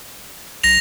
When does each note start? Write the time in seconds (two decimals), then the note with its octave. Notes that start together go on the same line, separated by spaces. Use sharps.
0.64 B1 A#6 F7